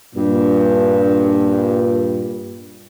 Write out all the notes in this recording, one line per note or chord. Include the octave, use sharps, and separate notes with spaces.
G2 A#2